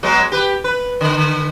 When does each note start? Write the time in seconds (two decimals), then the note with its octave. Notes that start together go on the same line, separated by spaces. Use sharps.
0.03 F#3 G#3 B3
0.32 G4 B4
0.64 B4
1.01 D3